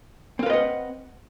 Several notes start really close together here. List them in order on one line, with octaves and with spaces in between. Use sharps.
C4 F5 B4 D#5 F#5